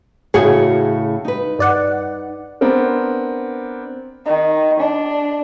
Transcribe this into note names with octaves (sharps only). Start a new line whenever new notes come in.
A2 C#3 F#4 G#4 C#5
D#4 B4
G2 D5 F#5
B3 C4 D4 A#4
D#3
D4